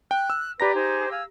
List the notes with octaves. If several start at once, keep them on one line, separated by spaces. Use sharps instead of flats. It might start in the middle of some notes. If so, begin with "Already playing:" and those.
G5 F#6
E6
G4 B4 D5 A#5 A#6
D#4 G#4 C5
G#4 F5 E6